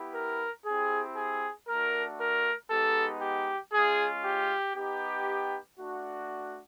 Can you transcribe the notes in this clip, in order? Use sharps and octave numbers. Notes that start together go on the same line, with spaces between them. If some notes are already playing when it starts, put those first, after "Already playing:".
Already playing: B3 E4 G4
A#4
C4 E4 G4 G#4
G#4
A3 D4 F#4 A#4
A#4
G#3 B3 D#4 G4 A4
G4
G#3 C#4 F4 G#4
G4
B3 D#4 G4
A3 D4 F#4